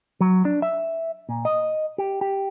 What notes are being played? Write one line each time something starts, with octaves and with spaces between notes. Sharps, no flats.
F#3
D4
E5
A#2
D#5
G4
G4